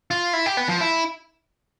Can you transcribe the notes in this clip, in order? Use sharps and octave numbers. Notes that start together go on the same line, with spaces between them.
F4
E4
G4
B3
F3
E4